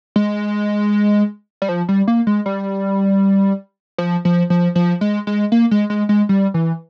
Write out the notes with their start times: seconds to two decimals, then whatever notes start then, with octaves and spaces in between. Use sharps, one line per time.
0.16 G#3
1.62 G3
1.69 F3
1.89 G3
2.08 A#3
2.27 G#3
2.46 G3
3.98 F3
4.25 F3
4.50 F3
4.75 F3
5.01 G#3
5.27 G#3
5.52 A#3
5.71 G#3
5.90 G#3
6.09 G#3
6.29 G3
6.54 E3